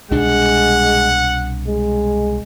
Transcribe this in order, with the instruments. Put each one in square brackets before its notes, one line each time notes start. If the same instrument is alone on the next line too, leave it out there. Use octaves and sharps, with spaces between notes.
[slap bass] C2 B2 D4 [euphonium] G#3 [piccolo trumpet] F#5
[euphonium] G#3